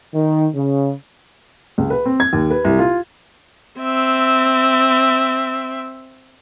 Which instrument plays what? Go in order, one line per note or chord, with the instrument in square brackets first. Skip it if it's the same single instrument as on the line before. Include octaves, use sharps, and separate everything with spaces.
[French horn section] D#3
C#3
[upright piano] C#2
B4
C4
G#6
D#2
B4
C2
F4
[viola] C4 E5